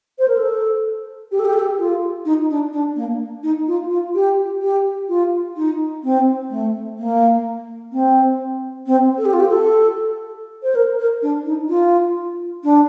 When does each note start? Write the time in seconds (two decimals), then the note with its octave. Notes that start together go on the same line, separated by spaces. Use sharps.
0.19 C5
0.28 A#4
0.38 A4
1.32 G4
1.39 A4
1.45 G4
1.53 A4
1.59 G4
1.79 F4
2.25 D#4
2.50 D4
2.73 D4
2.96 A#3
3.43 D#4
3.67 F4
3.90 F4
4.15 G4
4.62 G4
5.09 F4
5.57 D#4
6.04 C4
6.50 A3
6.98 A#3
7.92 C4
8.87 C4
9.18 A4
9.25 G4
9.33 F4
9.40 G4
9.49 A4
10.63 C5
10.75 A#4
10.99 A#4
11.22 D4
11.46 D#4
11.69 F4
12.64 D4